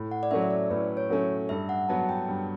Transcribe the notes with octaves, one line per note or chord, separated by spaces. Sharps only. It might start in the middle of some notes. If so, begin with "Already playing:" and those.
Already playing: A2
F#5
D5
F#3 A3 C#4 E5
E5
D5
A2 B4
C#5
F#3 A3 C#4
G2 E5
F#5
F#3 B3 A5
G5
G2